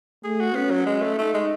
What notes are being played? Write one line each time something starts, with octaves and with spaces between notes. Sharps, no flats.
A3 G#4
F#4
B3 C#4
F#3
G#3
A3
A3 D#4
G#3